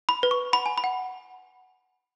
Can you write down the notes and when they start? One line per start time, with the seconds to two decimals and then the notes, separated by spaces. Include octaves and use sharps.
0.09 B5
0.23 B4
0.31 C#6
0.53 F#5 B5
0.66 G#5
0.78 B5
0.84 F#5